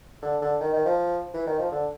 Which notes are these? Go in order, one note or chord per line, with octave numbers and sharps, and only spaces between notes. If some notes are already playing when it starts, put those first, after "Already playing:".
D3
D3
D#3
D#3
F3
E3
D#3
F3
D3